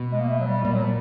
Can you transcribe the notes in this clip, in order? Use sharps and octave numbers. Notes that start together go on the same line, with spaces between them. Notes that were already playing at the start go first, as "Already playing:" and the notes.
Already playing: B2
G#3
A#3
A3
F#3
G3
A#2 G3
F#3
G3